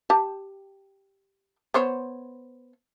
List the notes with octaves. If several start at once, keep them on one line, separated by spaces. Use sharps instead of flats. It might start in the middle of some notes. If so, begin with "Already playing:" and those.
G4 A5
B3 C5 C#5